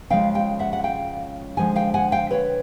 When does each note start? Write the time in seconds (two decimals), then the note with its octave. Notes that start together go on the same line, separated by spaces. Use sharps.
0.10 C#3 F3 G#3 F5 G5
0.35 F5 G5
0.59 E5 F#5
0.73 F#5
0.84 F5 G5
1.57 D3 F3 G#3 F#5 G#5
1.76 F5 G5
1.94 F#5 G#5
2.12 F5 G5
2.30 B4 C#5